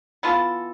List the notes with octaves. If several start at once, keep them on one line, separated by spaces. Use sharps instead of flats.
E3 B3 F4 A4